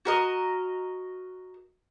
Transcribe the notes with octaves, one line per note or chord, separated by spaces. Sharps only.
F#4 A#4 D#5